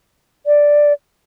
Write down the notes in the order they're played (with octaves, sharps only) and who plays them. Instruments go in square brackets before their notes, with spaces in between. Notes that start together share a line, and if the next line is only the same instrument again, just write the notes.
[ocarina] D5